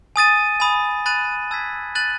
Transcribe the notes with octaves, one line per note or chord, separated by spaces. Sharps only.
G#5 D#6 A6 D#7
G#5 B5 D#6
B5 F#6 A6 D#7 F#7
A5 E6 G#6 B6
F#6 A6 D#7 F#7